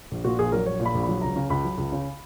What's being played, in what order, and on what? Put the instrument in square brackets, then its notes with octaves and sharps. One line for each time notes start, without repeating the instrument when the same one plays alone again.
[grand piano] A#1
A#2 F#4
A#1 G#4
F#3 A#4
A#1 C#5
A#2
B5
A#1
B5
F#3
C#2 A#5
C#3
C#2 B5
F#3
C#2
C#3